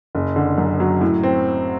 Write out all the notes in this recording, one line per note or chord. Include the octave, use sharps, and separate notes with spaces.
F#1
D3
F#2
F#3
A2
C4